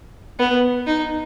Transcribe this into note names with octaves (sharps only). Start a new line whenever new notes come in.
B3
D#4